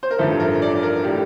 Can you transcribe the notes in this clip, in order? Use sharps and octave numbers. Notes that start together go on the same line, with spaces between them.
C5
A#4
A1 G2 F3 A3 E4 A4
A#4
D5
A#4
A2 G3 G4